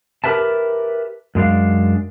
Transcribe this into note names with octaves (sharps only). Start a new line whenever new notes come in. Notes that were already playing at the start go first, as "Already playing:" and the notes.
G4 A#4 B4 E5 A5
F#2 G#3 D4 F5